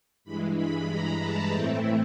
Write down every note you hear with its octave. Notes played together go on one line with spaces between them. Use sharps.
G2 E3 G#3 B5
B5
A#5
A5
A2 E3 A3 C4 E4 G5